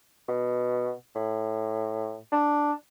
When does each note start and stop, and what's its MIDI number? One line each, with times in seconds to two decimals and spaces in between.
0.28 0.92 47
1.16 2.17 45
2.32 2.72 62